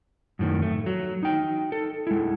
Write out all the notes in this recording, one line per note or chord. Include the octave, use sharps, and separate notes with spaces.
F#2 A2 D#3
A3
F#3
D#4 G5
A4
G#3 E4